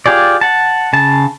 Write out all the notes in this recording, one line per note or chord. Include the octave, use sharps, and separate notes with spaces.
F4 G4 G#4 D5
F#5 A5
C#3 A5